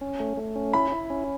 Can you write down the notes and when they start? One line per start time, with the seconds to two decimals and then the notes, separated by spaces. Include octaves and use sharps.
0.01 C#4
0.20 A3
0.37 A3
0.56 C#4
0.73 E4 B5
0.92 E4
1.10 C#4